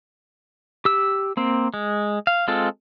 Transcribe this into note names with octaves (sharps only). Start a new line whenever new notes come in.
G4 E6
A#3 C4
G#3
F5
G#3 C4 F4 A4